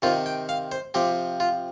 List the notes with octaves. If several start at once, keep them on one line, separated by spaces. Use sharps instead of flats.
C3 D#3 C4 F4
G5
F5
C5
C3 F3 C4 G4
F4